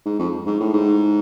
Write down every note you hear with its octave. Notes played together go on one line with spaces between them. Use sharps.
G#2
F2
G#2
A2
G#2